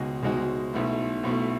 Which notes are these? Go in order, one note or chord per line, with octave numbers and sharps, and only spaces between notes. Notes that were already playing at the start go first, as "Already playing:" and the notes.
Already playing: C#2 B2 G#3 D#4 F#4
C#2 B2 G#3 D#4 F#4
B1 B2 A3 E4
B1 B2 A3 E4